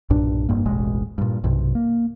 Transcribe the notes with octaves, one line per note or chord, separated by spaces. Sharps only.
B1 G2 A#2 D4
F1 G2 A#3
E1 A1 B2 G#3
G2 A#2
B1 G2 C3
A#3